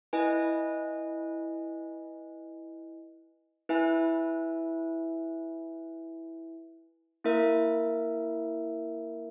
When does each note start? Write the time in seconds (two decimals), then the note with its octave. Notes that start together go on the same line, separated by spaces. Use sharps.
0.13 E4 B4 D#5 G#5
3.69 E4 B4 E5 G#5
7.24 A#3 E4 A#4 E5